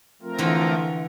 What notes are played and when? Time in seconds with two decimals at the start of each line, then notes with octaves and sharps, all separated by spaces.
0.22 F3 A3 C4 F4 A#4
0.38 D3 E3